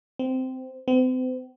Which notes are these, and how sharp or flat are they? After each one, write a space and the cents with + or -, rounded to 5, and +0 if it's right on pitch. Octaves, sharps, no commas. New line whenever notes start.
C4 -15
C4 -40